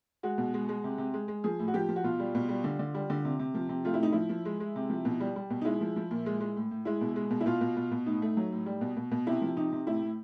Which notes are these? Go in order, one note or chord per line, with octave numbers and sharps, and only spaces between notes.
G#3 F#4
B2
G#3
G#3
C3
C3
G#3
G#3
F3 G#4
A2
F#4
F3 G4
F3
F#4
B2 F4
G3
B2
G3
D3
D3
G3
D3
C3
C3
F3
C3
A3 F4
E4
A2 D#4
F3 E4
F3
G#3
G#3
C3
F3
B2
G3
G3
B2
D#4
G#3 E4
F3
F3
A#2
G#3
G#3
A2
A2
G#3 E4
B2
G#3
B2
E4
B2 F4
B2
B2
B2
A2 D#4
A3
F#3
A2
G3
B2
B2
B2
C3 E4
F3
C3 D#4
C3
A2 E4
A2